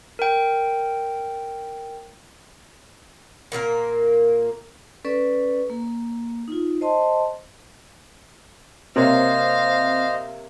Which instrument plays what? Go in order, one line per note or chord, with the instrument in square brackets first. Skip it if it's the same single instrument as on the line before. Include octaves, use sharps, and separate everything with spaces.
[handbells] A#4 G5
[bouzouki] A#2 A#3 F#4 A#4
[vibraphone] C#4 A4 B4 D5 C#6
A#3
D#4 F4
C5 D#5 A5 C6
[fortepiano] C3 A#3 C#5 [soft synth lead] C4 [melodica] C5 D#5 [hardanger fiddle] F5